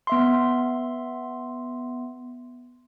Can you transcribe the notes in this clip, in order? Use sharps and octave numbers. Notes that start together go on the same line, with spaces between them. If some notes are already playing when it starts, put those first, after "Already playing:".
B3 E5 C6